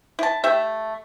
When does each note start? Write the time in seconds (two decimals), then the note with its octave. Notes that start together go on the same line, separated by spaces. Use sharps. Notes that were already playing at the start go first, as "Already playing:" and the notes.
0.19 E4 A5
0.44 A3 G4 E5